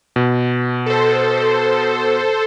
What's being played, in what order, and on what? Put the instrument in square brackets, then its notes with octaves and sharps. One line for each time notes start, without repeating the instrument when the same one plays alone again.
[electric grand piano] B2
[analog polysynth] A4 C5